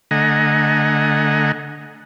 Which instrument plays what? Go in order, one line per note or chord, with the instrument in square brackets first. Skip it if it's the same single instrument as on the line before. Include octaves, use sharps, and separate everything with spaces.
[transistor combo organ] D3 A3 D#5 F#5 G#5 A#5